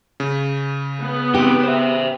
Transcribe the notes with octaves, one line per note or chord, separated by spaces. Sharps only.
C#3
B3
C4 D#4 G4
C5 E5